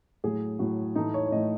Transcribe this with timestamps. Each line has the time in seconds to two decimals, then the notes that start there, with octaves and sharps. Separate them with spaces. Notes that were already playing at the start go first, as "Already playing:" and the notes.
0.24 A2 F#3 A3 G#4
0.59 A2 F#3 A3 F#4
0.95 A2 E3 A3 D#4
1.14 C#5
1.27 C#5
1.32 A2 E3 A3 D#5